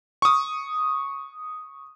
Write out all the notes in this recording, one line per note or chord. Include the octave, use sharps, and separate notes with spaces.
C#6 D#6